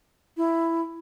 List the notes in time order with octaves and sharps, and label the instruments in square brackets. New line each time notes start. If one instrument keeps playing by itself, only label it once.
[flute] E4